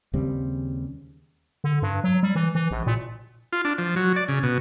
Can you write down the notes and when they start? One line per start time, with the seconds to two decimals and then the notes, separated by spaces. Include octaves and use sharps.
0.13 D#2 C#3 G3 C4
1.64 D3
1.82 G2
2.04 F#3
2.23 G3
2.35 E3
2.55 E3
2.71 A#1
2.86 A#2
3.53 F4
3.65 D4
3.78 F3
3.96 F#3
4.16 D5
4.28 C#3
4.43 B2